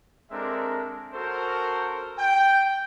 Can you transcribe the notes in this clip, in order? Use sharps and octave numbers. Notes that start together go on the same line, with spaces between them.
G#3 C4 D4 A4 A#4 E5
C#4 F#4 A4 A#4 C5
G5